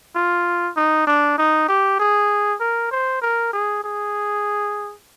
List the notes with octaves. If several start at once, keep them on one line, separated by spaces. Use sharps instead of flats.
F4
D#4
D4
D#4
G4
G#4
A#4
C5
A#4
G#4
G#4